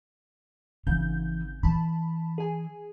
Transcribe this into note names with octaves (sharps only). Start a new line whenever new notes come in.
G#1 C#3 E3 G6
E3 A5 B5
G#4 G#5